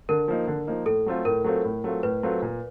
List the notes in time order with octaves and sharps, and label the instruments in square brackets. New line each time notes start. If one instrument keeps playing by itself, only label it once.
[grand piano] D3 [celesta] A#4
[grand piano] F3 A#3 D#4
D3
F3 A#3 D#4
[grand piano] A2 [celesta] A4
[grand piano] F#3 A3 C4 F4
[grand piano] A2 [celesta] A#4
[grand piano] F#3 A3 C4 F4
A2
F#3 A3 C4 F4
[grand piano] A2 [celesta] B4
[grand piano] F#3 A3 C4 F4
A#2